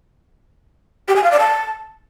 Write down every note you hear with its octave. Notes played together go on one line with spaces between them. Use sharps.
G4
G#5
F5
D5
A5